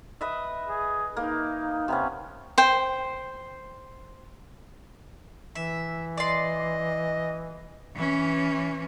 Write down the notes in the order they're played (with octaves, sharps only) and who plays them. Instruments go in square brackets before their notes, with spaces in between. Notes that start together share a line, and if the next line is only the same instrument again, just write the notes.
[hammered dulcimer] B4 D#5 E5
[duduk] G#4
[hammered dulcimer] A#3 [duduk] D#4
[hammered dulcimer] C3 B3 C#4
[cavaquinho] C5 G5
[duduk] E3 [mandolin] E5
[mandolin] D5 C6 [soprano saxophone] D#5
[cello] E3 C#4